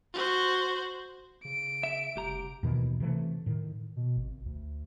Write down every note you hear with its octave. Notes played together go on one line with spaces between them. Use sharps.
F#4 C5
C#3 D7
E5
F1 C2 G4 A#5
D#2 B2 D#3 E3
C3 E3 A3
A2 D#3
B2
G#1
D2